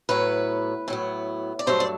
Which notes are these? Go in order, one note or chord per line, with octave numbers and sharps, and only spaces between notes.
A2 F#3 B3 B4
A2 F#3 B3
D5
G2 F#3 A3 C5
D5